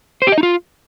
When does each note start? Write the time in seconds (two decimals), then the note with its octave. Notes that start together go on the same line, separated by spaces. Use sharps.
0.22 C5
0.27 G4
0.32 D#5
0.38 D#4
0.43 F4